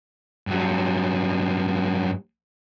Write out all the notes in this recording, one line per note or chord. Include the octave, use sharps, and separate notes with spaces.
G2 F#3